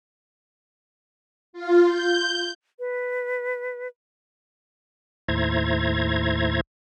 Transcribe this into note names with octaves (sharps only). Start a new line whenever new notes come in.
F4
G6
B4
D#2 A2 E4 C5 A#5 G#6